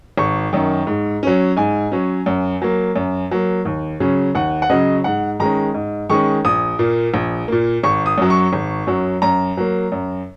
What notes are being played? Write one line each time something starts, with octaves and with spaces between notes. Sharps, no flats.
G#1 C#6
F#2 D#3
G#2
F#3 C#4
G#2 G#5
F#3 C#4
F#2
F#3 A#3
F#2
F#3 A#3
D#2
C#3 F#3 C#4
D#2 F#5
F#5
C#3 F#3 C#4 D#5
G#2 F#5
D#3 G#3 C#4 A#5
G#2
D#3 G#3 C#4 C#6
A#1 D#6
A#2 A#3
A#1
A#2 A#3
G#1 C#6
D#6
F#2 F#3
C#6
G#1
F#2 F#3
F#2 A#5
F#3 A#3
F#2